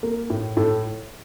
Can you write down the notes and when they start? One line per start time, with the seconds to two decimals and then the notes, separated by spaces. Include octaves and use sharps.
0.03 A#3 A#4
0.30 A2
0.57 A2 A4